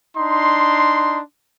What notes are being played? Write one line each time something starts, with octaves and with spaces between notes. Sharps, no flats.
D4 D#4 C6